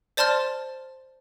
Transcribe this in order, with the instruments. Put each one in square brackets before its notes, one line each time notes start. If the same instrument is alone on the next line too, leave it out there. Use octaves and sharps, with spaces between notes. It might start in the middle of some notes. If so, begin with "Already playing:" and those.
[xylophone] C5 D5 A5 C6 F6 A6